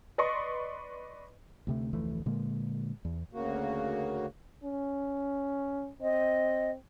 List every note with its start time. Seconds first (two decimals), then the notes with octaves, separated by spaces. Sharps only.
0.18 B4 D5 D#5 C6 C#6
1.67 D2 C3 A3
1.93 F1 D2 E3 A3
2.26 A#2 D3 G#3 A#3
3.05 E2
3.33 D2 C#3 A#3 F#4
4.64 C#4
6.01 C4 D#5